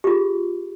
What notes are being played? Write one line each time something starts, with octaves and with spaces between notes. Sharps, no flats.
F4 G4 G#4